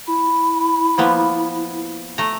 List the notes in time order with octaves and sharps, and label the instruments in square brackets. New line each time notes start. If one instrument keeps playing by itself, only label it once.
[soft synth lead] E4 [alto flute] B5
[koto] F3 A#3 B3
A3 A#5